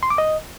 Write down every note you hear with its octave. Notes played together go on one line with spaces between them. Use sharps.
C6
D6
D#5